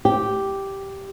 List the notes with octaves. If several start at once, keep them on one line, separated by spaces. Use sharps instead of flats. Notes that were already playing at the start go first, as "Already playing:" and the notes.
G4